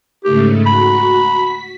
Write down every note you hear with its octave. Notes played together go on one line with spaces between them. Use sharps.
G#2 C#3 A3 G4
F#4 B5
B6